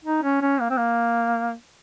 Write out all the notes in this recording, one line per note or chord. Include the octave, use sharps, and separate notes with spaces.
D#4
C#4
C#4
A#3
C4
A#3